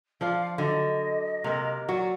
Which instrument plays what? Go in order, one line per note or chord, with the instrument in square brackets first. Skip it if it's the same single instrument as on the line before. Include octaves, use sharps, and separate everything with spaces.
[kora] F3 D4 F4 [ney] F5
[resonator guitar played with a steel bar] D3 [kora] F#3 [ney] D#5
[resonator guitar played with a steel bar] C3 [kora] A#3 A#4
[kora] F#3 [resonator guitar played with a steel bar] F#4 [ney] D5